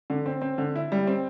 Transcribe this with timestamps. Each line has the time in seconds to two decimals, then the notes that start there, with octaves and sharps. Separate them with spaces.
0.10 D3
0.26 C4
0.42 C4
0.58 D3
0.76 E4
0.92 G3
1.07 C4